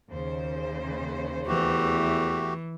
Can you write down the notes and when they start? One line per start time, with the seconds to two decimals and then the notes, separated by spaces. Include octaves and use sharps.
0.10 D#2 C#3 C5
1.47 E2 E3 A3 F#4 G4